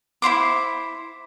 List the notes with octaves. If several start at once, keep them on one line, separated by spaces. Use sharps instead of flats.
E4 F4 C5 D6